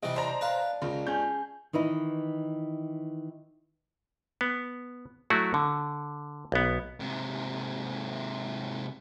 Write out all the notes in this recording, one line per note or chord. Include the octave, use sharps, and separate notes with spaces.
C3 E3 G3 D#5
D4 C5 A#5
B4 F5
C#2 C#3 A#4
C#4 G#4 G6
D#3 E3 D#4 E4
B3
F#3 A3 E4 F#4
D3
B1 B3
G#2 C3